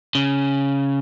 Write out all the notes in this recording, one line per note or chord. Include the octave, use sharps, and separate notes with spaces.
C#3